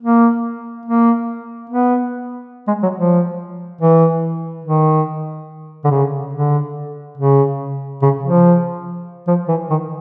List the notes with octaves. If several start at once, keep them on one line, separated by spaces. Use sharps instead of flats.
A#3
A#3
B3
G#3
F#3
F3
E3
D#3
D3
C#3
D3
C#3
C#3
F3
F3
E3
D#3